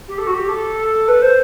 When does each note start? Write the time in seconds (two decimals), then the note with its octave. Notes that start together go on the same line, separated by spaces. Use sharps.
0.08 G4
0.18 A4
0.27 F#4
0.34 G4
0.48 A4
1.08 B4
1.22 C5